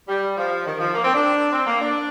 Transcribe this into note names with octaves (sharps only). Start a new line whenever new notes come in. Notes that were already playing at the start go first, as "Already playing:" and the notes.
G3
F3
D#3
F3
A#3
C4
D4
C4
A#3
D4